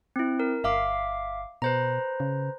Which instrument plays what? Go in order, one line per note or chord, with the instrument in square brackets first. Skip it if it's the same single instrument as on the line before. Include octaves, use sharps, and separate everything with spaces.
[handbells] C4 E4
A#4
[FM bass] G1 [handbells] E5 F5 D6
[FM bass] B2 [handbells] B4 C5 A#5
[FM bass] C#3